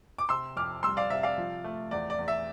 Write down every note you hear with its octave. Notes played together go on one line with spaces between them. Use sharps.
D6
C3 C6 E6
F2 D6 F6
G3 C6 E6
D5 F5
C3 E5
D5 F5
F3
A3
E2 D5
D5
E2
E5